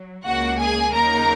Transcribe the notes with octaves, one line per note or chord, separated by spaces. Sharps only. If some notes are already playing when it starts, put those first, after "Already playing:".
Already playing: F#3
C#2 C#3 A#3 F#4 F#5
G#4 G#5
D#2 C#3 F#3 A#3 D#4 A#4 A#5